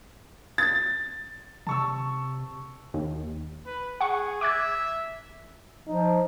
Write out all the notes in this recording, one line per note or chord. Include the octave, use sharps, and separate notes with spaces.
A6
C3 A5 C#6 E6
D#2
B4
G#4 F#5 C#6
E5 D6 F#6 G#6
F3 D#4